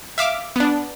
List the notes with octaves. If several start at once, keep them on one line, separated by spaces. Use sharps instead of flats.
E5 F5 D6
B3 D4